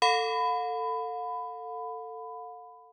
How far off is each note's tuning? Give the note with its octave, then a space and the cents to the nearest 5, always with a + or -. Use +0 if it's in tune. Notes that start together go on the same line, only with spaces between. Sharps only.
A4 +20 F5 +45 B5 +20